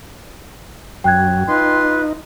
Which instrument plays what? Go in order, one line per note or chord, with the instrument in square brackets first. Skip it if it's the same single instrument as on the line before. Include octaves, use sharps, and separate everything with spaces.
[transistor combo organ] F#2 [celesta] G5 F#6 G#6
[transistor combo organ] D#4 [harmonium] F4 B4 [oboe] C6